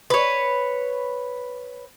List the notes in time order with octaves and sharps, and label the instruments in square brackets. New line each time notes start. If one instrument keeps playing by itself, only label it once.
[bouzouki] B4 C#5